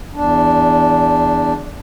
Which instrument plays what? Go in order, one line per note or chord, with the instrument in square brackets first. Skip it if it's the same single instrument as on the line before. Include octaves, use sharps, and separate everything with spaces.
[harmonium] E2 D4